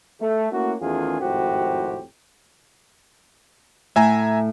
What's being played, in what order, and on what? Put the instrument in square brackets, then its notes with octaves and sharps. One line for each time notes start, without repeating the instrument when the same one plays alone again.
[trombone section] A3
A3 A#3 C#4 E4 F#4
E2 D#3 A3 C#4 F4 G#4
G#1 F2 A2 C4 F#4 G4
[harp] A2 [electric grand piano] E5 G#5 A#5